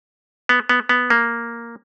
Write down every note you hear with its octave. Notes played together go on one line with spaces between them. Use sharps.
B3
B3
B3
A#3